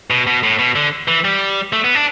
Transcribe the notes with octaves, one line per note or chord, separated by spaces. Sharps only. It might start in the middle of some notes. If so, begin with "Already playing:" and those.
B2
B2
A2
B2
D3
E3
G3
A3
B3
D4